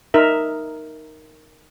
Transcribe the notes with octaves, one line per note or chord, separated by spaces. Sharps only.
D#4 A#4 E5